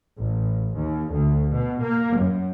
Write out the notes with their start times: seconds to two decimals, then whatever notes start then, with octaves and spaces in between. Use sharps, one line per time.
0.17 A1
0.74 D#2
1.10 D2
1.53 B2
1.81 A#3
2.17 F#2